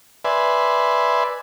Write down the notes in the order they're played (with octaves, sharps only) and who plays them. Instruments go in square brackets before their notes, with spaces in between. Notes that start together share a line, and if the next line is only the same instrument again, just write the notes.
[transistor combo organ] B4 D5 E5 G#5 C6